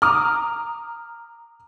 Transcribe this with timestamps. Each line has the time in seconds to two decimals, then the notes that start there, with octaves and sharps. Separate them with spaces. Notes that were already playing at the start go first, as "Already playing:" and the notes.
0.02 A#5 D6 D#6 F6